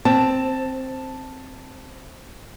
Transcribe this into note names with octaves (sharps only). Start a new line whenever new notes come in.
C4 A5